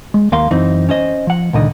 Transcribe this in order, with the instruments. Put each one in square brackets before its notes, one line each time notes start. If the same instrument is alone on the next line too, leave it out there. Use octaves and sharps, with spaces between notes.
[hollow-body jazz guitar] G#3
D#2 A#3 F5 C6
F#2 E3 C4 D#4
C#4 C5 D#5
F3 F#5
C#2 A#2 D3 D#3 D#5